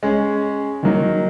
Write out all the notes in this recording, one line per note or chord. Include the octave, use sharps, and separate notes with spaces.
G#3 C#4 G#4
D#3 F#3 A#3 D#4